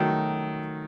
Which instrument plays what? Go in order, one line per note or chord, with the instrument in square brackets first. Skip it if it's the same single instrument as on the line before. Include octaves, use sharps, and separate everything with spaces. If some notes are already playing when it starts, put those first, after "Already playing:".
Already playing: [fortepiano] D#3 F#3 A3